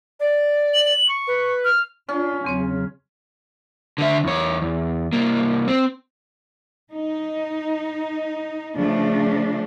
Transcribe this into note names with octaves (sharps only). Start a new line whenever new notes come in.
D5
F#7
C#6
B4
F6
C#4 D4 F4
E2 C#3 F#3 C4 C#5
D3 E5
E2 C#5
E2
C2 A#3
C4
D#4
C#3 F3 A3 D4